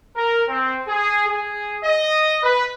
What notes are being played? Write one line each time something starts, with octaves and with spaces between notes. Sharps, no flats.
A#4
C4
G#4
G#4
D#5
B4